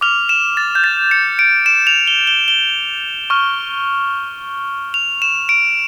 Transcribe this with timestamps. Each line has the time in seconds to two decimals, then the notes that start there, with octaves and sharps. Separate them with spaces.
0.01 D6 F6 F7
0.29 E7
0.57 A6
0.75 G6
0.84 A6
1.11 C#7
1.39 D7
1.66 E7
1.87 F7
2.07 G7
2.27 G7
2.48 G7
3.30 C#6 F6
4.94 F7
5.22 E7
5.49 D7